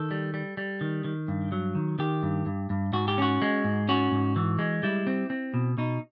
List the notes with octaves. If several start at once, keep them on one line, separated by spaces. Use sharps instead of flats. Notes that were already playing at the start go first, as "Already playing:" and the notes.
Already playing: D#3 A4
G3
G3
G3
D#3
D#3
G2
F#3
D#3
D#3 G4
G2
G2
G2
G#2 F#4
G4
C#4 F#4
G#3
G#2
C#4 F#4
G#2
E3
G#3
G3 E4
C4
C4
B2
B2 D#4